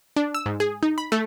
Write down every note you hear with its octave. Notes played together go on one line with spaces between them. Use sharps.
D4
E6
G#2
G#4
D#4
B5
A3